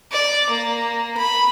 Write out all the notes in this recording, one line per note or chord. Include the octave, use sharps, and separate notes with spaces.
D5
A#3
B5